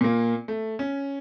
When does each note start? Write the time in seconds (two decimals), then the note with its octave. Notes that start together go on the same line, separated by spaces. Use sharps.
0.01 A#2 A#3
0.48 A3
0.79 C#4